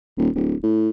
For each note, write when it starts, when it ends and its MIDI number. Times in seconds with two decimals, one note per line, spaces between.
0.18 0.29 27
0.35 0.55 26
0.63 0.90 45